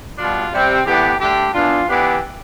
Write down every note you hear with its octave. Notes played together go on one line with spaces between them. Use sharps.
B2 G3 D4 F4
C3 G3 C4
A2 E3 B3 D4 G4
D3 A3 D4 G4
E3 B3 D4 F4
E3 B3 D4 G4